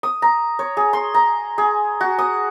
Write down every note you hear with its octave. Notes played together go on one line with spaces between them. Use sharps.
D#6
A#5
C#5
G#4
C6
A#5
G#4
F#4
D#6